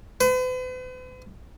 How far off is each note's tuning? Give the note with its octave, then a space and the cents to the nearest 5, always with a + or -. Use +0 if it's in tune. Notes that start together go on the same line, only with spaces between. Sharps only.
B4 +45